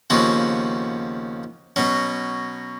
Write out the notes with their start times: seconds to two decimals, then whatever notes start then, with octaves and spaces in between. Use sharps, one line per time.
0.10 D#2 C#3 F3 B3 F#4
1.76 B2 F#3 C#4